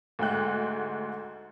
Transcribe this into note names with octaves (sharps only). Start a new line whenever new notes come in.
D2 G#2 G5 F#6